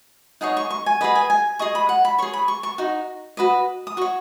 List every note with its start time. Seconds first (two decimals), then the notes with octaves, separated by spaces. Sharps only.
0.41 D#4 G#4 C#5 F#5
0.57 C#6
0.71 C#6
0.86 G#5
1.01 G#4 B4 D#5 F#5
1.15 G#5
1.30 G#5
1.59 G#4 D#5 C#6
1.75 B5
1.89 F#5
2.05 B5
2.18 G#4 C#5 C#6
2.33 B5
2.48 C#6
2.63 C#6
2.78 D#4 F#4
3.37 F#4 B4 D#5
3.87 D#6
3.97 F#4 C#5 C#6